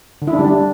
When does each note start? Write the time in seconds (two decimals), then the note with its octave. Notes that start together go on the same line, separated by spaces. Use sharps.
0.22 D3
0.27 E4
0.33 D4
0.39 G3
0.45 D4